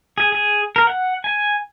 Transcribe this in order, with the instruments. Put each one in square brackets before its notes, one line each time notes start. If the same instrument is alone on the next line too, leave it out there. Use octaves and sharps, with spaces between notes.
[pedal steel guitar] G#4
G#4
A#4
F#5
G#5